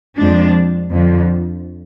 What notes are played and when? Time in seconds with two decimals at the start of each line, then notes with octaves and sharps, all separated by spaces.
0.16 F2 F3 G#3 D4
0.90 F2 D3 F3